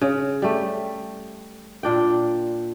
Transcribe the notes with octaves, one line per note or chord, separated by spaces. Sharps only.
C#3
G3 A3
A#2 D4 G5